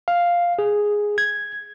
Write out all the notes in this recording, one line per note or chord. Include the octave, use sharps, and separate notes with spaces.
F5
G#4
G#6